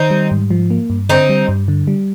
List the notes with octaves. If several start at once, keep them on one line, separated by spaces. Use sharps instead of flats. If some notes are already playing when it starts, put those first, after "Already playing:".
Already playing: D#3 C4 D#4
G3
G#2
F3
A#3
G2
D3 C4 D#4
G3
G2
D3
G3